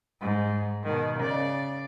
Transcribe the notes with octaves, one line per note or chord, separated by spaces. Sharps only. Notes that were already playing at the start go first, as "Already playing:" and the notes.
G#2
B2 D#3
C#3 D5